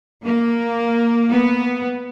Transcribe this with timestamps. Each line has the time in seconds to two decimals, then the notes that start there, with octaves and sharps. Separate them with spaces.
0.23 A#3
1.29 B3